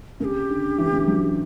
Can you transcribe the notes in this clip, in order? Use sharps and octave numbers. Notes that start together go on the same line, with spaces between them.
C#3 G4 A#4
D3
E3
D3
C#3
D3
F#3